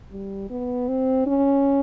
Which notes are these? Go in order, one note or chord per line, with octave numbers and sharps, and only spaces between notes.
G3
B3
C4
C#4